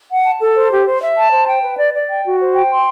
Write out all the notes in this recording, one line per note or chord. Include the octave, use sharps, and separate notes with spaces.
F#5
A5
A4
C5
G4
C5
E5
A5
C5
G5
B4
D5
D5
G5
F#4
C5
G5
C6